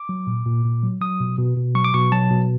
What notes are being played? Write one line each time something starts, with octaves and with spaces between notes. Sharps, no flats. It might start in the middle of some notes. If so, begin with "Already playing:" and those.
Already playing: D6
F#3
A#2
A#2
A#2
F#3
F#3 D#6
B2
B2
B2
F#3 C#6
D6
B2 C#6
F#3 A5
B2